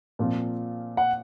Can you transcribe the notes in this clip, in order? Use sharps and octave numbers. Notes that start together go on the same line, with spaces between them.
A#2 F3 C4 F4
F#5